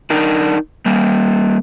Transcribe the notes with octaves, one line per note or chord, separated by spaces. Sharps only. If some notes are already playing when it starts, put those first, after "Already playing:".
D4 D#4 A#4 D5
G3 A#3